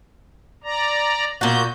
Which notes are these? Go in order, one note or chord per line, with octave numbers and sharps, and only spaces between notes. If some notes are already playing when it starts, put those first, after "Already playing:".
D5 A#5
A#2 F#4 G6